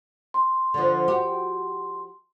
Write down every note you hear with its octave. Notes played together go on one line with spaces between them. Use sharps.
C6
D3 F3
F#4 G4